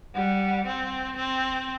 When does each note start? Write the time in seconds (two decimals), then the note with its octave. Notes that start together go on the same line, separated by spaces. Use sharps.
0.15 G3 F#5
0.66 C4
1.17 C4